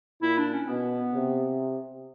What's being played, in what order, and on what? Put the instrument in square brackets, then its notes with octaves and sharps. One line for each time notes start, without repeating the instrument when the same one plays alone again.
[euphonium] A#2 [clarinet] E4
[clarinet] D4
C#4
[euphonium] B2 [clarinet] B3
[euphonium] C3